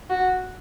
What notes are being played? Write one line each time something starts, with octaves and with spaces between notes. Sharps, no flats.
F#4